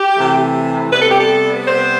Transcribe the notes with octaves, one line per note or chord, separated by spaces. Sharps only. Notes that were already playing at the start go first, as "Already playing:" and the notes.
Already playing: G4
C3 E3 A3
C3 G3 B3 B4
A4
G4
A4
C3 G3 B3 C5